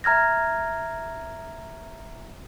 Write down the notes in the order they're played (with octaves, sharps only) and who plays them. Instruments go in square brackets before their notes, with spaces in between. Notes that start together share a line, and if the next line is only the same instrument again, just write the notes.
[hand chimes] E5 A#5 F6 G#6 A#6